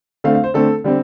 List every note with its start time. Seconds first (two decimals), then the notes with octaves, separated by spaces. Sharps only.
0.24 D3 A3 C4 F5
0.35 F5
0.44 C5
0.54 D3 A3 C4 A4
0.84 D3 G3 C4